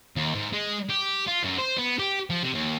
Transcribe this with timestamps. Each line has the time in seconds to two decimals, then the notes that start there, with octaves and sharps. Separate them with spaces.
0.16 D#2
0.35 G#2
0.53 G#3
0.89 G4
1.27 F4
1.43 F#2
1.58 C5
1.78 B3
1.99 G4
2.30 F3
2.43 C3
2.54 D#2